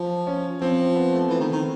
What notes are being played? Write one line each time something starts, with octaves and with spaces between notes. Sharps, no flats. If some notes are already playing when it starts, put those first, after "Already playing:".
Already playing: F3
C#4
F3 C4
B3
A3
E3
D#3
D#3